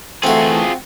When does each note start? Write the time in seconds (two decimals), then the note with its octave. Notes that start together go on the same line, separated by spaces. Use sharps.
0.23 E3 A3 C4 F4 F#4 G#4